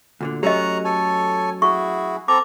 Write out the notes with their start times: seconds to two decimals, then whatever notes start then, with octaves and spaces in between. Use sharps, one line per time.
0.21 D2 A#2 D3
0.43 F#3 A3 C#4 G4 C#5 D#5 A#5 F#6
0.85 A4 C#5 G#5
1.62 E4 F#4 G#4 C#6
2.28 C4 A4 A#5 D6